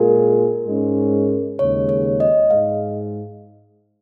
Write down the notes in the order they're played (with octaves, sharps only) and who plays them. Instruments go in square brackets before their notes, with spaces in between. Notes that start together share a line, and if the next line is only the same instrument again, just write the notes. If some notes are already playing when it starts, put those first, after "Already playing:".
Already playing: [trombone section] A#2 G#3 F4 G#4 [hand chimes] A#4
[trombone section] G#2 G#3 C#4
[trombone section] D#2 C#3 G#3 [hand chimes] C#5
[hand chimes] C#5
D#5
[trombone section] G#2 G#3 [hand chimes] F5